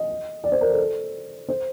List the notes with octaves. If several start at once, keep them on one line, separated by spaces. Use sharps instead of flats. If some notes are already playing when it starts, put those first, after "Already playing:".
Already playing: D#5
D5
C5
A#4
A4
C5